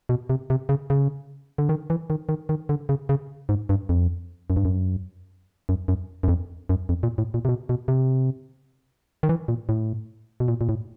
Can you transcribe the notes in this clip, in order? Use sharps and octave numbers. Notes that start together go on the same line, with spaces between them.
B2
C3
C3
C#3
C#3
D3
D#3
E3
D#3
D#3
D#3
D3
C#3
C#3
G#2
G2
F2
F#2
G2
F#2
F#2
F#2
F#2
F2
F#2
F2
A#2
A2
A#2
C3
B2
B2
C3
D#3
E3
A#2
A2
B2
A#2
A#2
A2